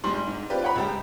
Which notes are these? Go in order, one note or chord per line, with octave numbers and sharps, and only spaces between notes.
F1 G#2 G3 C6 F#7
G#2
C4 F4 G4 B4 D5
B4 C#5 F#5 G5 A#5 B5
C#2 G3 G5